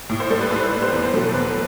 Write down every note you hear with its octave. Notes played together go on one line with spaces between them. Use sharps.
A2
C5
G3 A4
B4
A2 C5
B4
G3
C5
E2 B4
C5
B2 F#3 A3 B4
A4
E2 B4